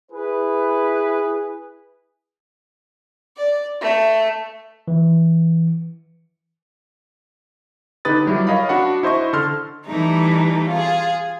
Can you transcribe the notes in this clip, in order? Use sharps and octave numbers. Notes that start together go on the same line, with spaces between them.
E4 G#4 B4
D5
A3
E3
D3 D#4 G4 B4 D#6 A6
F#3 G3 E4 G4
A#4 C#5 D#5 F5 B5
D4 F#4 F#5 B5
E4 C5 D#5 C#6
D3 A4 C6 F6
E3 G3 A3 D#4
F4 G#4